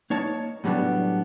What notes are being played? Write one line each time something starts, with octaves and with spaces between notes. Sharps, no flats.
A#3 D#4 C#5 A5
A2 F#3 G3 B3 C4 D4